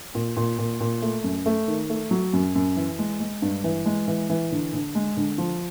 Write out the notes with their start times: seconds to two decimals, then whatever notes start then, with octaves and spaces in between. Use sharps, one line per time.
0.15 A#2
0.37 A#2
0.59 A#2
0.80 A#2
1.02 A3
1.24 F#2
1.46 A3
1.68 D#3
1.90 A3
2.11 F#3
2.33 F#2
2.55 F#2
2.76 E3
2.99 G#3
3.20 G#3
3.42 G2
3.64 E3
3.86 G#3
4.08 E3
4.30 E3
4.52 D3
4.73 D3
4.95 G#3
5.17 D3
5.38 F3